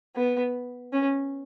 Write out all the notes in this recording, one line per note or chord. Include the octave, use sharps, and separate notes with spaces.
B3
C#4